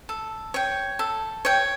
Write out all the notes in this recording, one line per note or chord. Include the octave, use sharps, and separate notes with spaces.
A4
C#5 G5
A4
C#5 G5